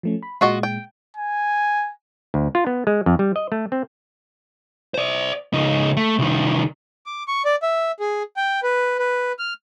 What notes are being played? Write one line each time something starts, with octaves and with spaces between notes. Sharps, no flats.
F3 A3 C#4
B5
A#2 G#3 F4 F#4 D#5
G5
G#5
D2
F4
B3
G#3
F2
G3
D#5
A3
C4
C5 D5
C#2 D#4
A3
C2 D#3
D6
C#6
D5
E5
G#4
G5
B4
B4
F6